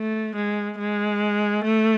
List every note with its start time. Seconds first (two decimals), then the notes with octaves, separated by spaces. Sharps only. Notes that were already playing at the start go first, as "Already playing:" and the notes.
Already playing: A3
0.35 G#3
0.78 G#3
1.64 A3